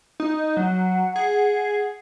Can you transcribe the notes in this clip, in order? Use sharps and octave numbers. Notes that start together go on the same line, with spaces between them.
D#4
F#3 F#5
G#4